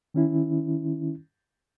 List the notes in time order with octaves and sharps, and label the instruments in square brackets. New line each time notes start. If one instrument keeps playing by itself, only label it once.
[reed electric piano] D#3 C#4 E4